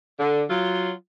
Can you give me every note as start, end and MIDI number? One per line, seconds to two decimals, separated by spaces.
0.18 0.43 50
0.49 0.90 54
0.49 0.90 65